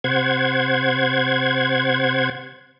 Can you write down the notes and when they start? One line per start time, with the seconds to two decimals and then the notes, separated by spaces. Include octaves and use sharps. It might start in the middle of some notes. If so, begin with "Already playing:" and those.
0.04 C3 C5 F#5 G#6